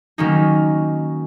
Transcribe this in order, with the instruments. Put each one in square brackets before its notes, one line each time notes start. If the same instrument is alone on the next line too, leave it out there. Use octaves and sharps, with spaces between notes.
[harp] D#3 F#3 A#3 C#4 D#4